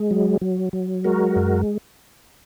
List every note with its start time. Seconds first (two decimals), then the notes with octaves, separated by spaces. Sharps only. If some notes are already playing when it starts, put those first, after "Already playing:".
Already playing: G#3
0.11 F#3
0.41 F#3
0.73 F#3
1.04 G#3 F#4 A#4
1.36 F#2